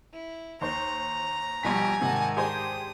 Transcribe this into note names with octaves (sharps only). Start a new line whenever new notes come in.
E4
D#2 C5 A#5
A#1 B2 G3 G4 G#5 B6
G#2 C3 D#3 F#5 A5
D4 G4 G#4 C5 D#6